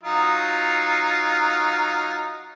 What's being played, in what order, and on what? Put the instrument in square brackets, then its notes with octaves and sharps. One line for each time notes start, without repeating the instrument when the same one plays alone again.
[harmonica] F#3 D#4 F4